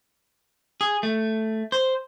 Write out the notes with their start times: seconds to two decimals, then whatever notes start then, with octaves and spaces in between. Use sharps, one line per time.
0.81 G#4
1.03 A3
1.72 C5